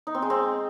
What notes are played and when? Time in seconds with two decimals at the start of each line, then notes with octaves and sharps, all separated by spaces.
0.07 D#4
0.14 C4
0.22 G#3
0.30 C4